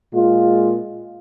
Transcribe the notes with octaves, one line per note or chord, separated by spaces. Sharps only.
A#2 G#3 F4